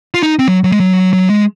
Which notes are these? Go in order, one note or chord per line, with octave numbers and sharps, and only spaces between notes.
F4
D#4
C4
F#3
F#3
G#3
F#3
F#3
G#3